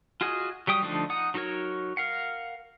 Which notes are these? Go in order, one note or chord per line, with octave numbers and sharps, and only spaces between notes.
F4 F#4 G#4 D#5
F#3 G3 G5 D#6
D3 F3 A3 D4 D#4
D#4 F#5 D#6
F#3 D#4 F#4 A#4 C#5
A#4 F5 F#5